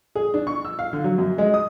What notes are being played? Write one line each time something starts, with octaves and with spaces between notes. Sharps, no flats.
G#4
D4
C#6
E6
F5
D3
F#3
F#2
G#3
D#6